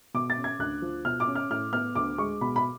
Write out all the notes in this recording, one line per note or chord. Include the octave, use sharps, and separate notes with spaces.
B2 D6
A6
C#4
G#6
D2 F#6
F3
B2 F6
D6
C#4
F6
A2 F6
B3 F6
D2 D6
G#3 C#6
B2 B5
B5